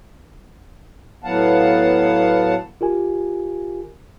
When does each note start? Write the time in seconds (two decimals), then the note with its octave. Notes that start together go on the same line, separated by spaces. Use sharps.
1.24 A2 F#3 B3 F5 F#5 A5
2.81 F4 G4 A#4 G#5